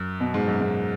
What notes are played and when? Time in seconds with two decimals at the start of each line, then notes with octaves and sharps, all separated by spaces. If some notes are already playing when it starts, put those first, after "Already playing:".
Already playing: F#2
0.20 B2
0.34 G#2
0.48 F#2
0.60 G#2